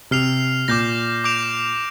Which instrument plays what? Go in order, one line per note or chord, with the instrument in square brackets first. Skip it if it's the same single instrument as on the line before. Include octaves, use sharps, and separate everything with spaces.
[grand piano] C3 [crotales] F6 C7 F7
[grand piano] A#2 [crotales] D6 G6 A#6
[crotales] D6 G6 D7 F7